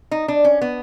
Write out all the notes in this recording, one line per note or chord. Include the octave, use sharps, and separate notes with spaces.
D#4
D4
C#4
B3